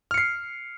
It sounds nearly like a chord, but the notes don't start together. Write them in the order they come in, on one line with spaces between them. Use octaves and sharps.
F6 C#7 C7